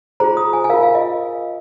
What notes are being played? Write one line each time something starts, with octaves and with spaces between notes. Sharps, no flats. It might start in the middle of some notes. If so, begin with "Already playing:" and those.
F4 G#4 C5 A#5
D#6
G#5
G#5
F4 A#4 F5
F5
D#5